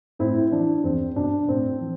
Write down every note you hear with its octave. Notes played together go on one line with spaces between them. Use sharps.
A2 C4 E4
E3 D4
E2 C4
B2 D4
A2 C4
E3